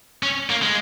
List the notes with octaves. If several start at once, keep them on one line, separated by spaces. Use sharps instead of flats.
C#4
A#3
G#3